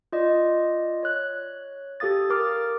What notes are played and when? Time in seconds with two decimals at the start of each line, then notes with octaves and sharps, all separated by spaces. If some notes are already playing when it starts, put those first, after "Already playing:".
0.12 F4 D5 D#5
1.03 C#5 F#6
2.00 G4 A4 F5 D#6 A6
2.30 A#4 D6 F6 A6